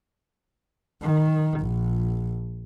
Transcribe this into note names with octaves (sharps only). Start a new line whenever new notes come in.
D#3
A#1